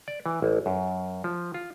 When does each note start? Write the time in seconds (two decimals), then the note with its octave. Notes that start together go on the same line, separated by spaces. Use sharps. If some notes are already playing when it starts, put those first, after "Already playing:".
0.08 D5
0.26 E3
0.42 A1
0.66 F#2
1.24 F3
1.54 F4